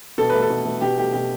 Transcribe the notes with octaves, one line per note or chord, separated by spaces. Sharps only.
B2 A4
A3 B4
A4
B2
A3
B2 G4
A3 G4
B2 G4